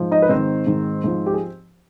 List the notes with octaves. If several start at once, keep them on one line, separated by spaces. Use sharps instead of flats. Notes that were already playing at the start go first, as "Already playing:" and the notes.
Already playing: G#2 F3
D#4 D#5
B4
G#2 D#3 C4 C5
G#2 D#3
G#2 F3
G4
G#4